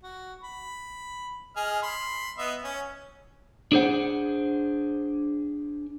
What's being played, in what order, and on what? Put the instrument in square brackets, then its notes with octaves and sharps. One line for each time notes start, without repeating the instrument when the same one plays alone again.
[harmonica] F#4
B5
G#4 D#5 F6
B5 C6
B3 D#5 E5
C#4
[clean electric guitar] D4 G#4 C5 F#5